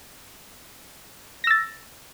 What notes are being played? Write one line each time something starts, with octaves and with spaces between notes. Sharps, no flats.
E6 A6 A#6